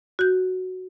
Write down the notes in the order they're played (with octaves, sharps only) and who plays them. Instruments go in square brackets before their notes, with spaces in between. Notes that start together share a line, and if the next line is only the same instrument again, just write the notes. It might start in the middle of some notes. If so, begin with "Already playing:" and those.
[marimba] F#4 G6